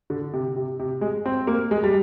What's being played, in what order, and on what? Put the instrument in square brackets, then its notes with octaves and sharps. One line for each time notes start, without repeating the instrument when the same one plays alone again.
[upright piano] D3
C3
C3
C3
G#3
C4
A#3
G#3
G3